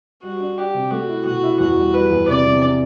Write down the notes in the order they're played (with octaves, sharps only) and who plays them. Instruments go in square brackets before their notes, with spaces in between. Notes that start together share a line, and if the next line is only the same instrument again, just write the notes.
[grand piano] G3 [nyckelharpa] F#4
[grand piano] D4
[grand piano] D4 [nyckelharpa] G4
[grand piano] C3
[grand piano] A3 [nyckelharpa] F#4
[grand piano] E4
[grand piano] B2 [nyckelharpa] F#4
[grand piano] E4
[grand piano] E2 [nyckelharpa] F#4
[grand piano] G3
[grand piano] G3 [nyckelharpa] B4
[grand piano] E2
[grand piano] C3 [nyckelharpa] D5
[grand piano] C3
D4